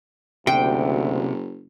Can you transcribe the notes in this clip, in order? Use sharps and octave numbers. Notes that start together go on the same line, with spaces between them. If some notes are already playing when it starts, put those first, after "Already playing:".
F#1 D2 C3 G5